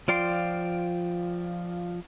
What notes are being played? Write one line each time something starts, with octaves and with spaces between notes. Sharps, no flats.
F3 F4 D5 G5 C6